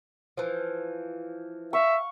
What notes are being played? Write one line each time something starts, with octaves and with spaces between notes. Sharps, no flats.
E3 F3
E5 F5 C#6